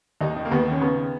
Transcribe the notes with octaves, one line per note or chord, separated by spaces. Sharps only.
D#2 D#4
D#3
A#3
D#2 B3
D#3 C#4
C#3 B3